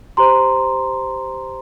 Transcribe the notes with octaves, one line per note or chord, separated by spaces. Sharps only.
G4 C5 A#5 C6